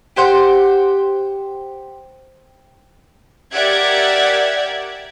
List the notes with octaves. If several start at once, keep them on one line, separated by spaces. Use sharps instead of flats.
G4 C5 F#5 G5
G4 A#4 D5 E5 F#5 G#6